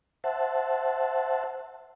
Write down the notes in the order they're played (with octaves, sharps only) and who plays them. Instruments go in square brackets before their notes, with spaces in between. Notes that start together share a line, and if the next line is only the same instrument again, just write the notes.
[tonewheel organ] C5 E5 F#5 A5